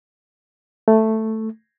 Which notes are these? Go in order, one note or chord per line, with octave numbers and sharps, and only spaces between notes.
A3